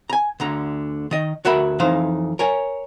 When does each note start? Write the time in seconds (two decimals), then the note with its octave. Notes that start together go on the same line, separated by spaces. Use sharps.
0.10 G#5 A#5
0.40 D2 D3 A#5
1.11 D#3 D#5
1.45 D2 F#4 A#4 E5 B5
1.80 F2 E3 D#4 C5 F5
2.39 A#4 C#5 G#5